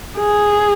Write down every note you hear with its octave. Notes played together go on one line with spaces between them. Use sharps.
G#4